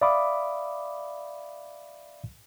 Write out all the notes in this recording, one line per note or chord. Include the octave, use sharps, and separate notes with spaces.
D5 E5 F5 B5 D6 D#6